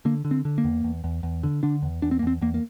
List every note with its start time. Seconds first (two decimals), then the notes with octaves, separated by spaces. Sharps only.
0.05 D3 A#3
0.25 D3
0.31 C4
0.45 D3
0.58 A#3
0.64 E2
0.84 E2
1.04 E2
1.23 E2
1.43 D3
1.63 D3 D4
1.83 E2
2.02 E2 D4
2.11 C4
2.19 A#3
2.23 E2 C4
2.42 E2 A#3
2.54 A#3